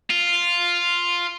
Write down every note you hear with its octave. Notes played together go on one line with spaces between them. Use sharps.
F4